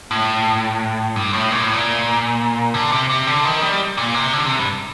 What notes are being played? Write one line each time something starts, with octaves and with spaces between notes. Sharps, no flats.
A2
G2
A2
A#2
A2
A#2
D3
C3
C3
D3
D#3
G3
A#2
C3
D3
C3
G2